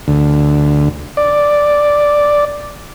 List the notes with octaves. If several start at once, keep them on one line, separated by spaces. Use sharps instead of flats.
D2
D5